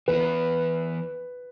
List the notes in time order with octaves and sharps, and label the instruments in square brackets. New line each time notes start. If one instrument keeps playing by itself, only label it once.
[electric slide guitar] E3 B3 E4 [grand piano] B4